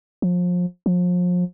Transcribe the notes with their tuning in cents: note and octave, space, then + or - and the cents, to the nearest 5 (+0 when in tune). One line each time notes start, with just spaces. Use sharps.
F3 +30
F3 +35